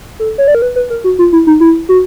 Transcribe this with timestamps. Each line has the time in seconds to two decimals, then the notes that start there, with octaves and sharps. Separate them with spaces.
0.19 A4
0.38 C#5
0.48 D5
0.55 A#4
0.62 B4
0.76 B4
0.90 A#4
1.04 F#4
1.19 F4
1.32 E4
1.47 D#4
1.60 E4
1.89 F#4